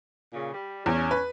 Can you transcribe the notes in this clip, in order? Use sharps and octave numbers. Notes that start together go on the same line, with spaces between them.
A#2 C#3
G3
E2 C#4
B4